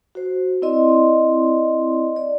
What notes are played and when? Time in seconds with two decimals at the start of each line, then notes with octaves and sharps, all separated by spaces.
0.15 F#4 C5
0.62 C4 E4 D5 D#5 C6
2.16 D5